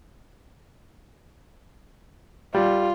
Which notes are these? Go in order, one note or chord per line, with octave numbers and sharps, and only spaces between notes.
G3 F4